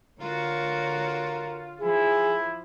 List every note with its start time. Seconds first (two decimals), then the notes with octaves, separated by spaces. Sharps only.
0.21 D3 F4 F#4 A#4 C#5
1.81 F3 E4 G#4